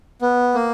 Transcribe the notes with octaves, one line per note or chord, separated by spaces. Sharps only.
B3
A#3